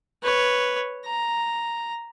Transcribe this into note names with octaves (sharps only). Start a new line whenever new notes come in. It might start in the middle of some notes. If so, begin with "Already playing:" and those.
B4 C#5
A#5